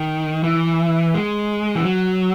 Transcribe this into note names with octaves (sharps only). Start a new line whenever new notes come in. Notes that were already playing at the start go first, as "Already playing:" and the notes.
Already playing: D#3
E3
G#3
E3
F#3